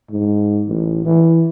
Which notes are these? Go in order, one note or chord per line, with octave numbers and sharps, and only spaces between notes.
G#2
A1
E3